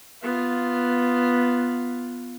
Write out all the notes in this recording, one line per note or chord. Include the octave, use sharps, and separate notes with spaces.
B3 F4